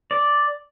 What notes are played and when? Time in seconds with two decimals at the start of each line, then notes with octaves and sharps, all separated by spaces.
0.11 D5